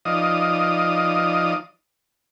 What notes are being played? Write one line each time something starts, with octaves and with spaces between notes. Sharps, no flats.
F3 D#4 D5 D#5 F5 D#6